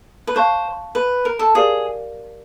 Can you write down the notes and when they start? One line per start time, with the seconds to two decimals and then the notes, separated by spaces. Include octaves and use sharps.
0.27 B4
0.35 C5 F5 A5 C#6 F#6
0.95 B4
1.25 A#4
1.39 A4
1.54 G4 G#4 A#4 D5 F5